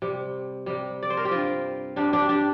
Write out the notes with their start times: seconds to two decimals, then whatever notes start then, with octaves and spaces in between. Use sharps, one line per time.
0.02 C3 G3
0.66 C3 G3
1.03 D5
1.10 C5
1.17 A#4
1.25 G4
1.31 G2 G3 C4 F4
1.96 G2 G3 D4 G4
2.13 D4 G4
2.29 D4 G4